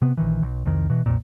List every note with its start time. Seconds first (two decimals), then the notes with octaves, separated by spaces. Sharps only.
0.02 C3 B3
0.17 A#1 D#3 E3
0.42 B1
0.65 C2 F2 D#3
0.90 B2 E3
1.06 B1 F2 A#2